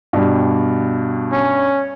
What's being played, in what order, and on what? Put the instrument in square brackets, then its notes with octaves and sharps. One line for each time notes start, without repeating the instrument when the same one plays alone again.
[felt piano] G2 [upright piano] B2 G3
[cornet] C#4